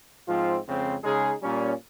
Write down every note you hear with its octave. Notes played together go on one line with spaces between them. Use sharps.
G#2 F3 C4 F4
F2 C#3 G#3 C4
C#3 G#3 D#4 G#4
A#2 G3 A#3 C#4